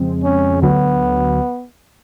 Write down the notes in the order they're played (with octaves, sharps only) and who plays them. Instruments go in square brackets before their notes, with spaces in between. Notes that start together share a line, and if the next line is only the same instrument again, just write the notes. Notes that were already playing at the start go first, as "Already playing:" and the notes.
Already playing: [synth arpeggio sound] F2 C#3 F3 G#3 C4
[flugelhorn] C#4
[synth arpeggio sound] D2 D3 F#3 [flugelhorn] B3